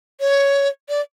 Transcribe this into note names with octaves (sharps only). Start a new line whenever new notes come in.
C#5
D5